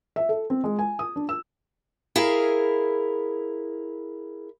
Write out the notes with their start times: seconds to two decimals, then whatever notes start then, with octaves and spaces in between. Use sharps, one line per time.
0.16 E5
0.29 A4
0.50 C4
0.64 G#3
0.79 G#5
0.99 D#6
1.16 D4
1.29 E6
2.16 E4 G#4 A#4 F5